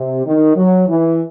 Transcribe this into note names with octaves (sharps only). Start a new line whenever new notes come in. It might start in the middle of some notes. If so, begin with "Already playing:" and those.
Already playing: C3
D#3
F#3
E3